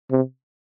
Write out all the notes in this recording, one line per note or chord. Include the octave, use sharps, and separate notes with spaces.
C3